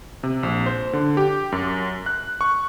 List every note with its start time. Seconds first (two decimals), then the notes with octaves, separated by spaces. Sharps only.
0.23 C3
0.43 A#1
0.66 C5
0.93 D3
1.17 G4
1.52 F#2
2.06 F#6
2.41 C#6